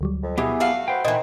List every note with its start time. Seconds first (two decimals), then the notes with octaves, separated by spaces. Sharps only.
0.01 D2 F#3 G3
0.22 F2
0.38 B2 E3 B3 G4 G#4
0.60 A3 F#4 F5 A5 C7
0.88 B3 B4 C5 G5
1.05 A#2 D#3 E3 D#5 F#5